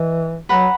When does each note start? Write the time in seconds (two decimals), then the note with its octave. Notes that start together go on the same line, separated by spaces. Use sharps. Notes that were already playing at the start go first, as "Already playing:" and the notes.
Already playing: E3 D#5
0.49 F#3 B4 F#5 A#5